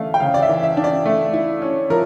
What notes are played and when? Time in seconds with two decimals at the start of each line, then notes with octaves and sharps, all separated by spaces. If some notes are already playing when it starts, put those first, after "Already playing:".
Already playing: E3 A3 D4 F5
0.14 G5
0.20 C#3 F5
0.34 D5
0.42 E5
0.49 E3
0.63 E5
0.77 D4
0.84 D5
1.06 A3
1.33 E4
1.62 C#4
1.90 F3 A#4